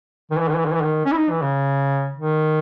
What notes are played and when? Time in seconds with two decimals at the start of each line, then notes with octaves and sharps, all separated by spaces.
0.31 D#3
0.39 E3
0.49 D#3
0.57 E3
0.65 D#3
0.74 E3
0.82 D#3
1.05 C#4
1.12 E4
1.18 D#4
1.30 E3
1.42 C#3
2.16 D#3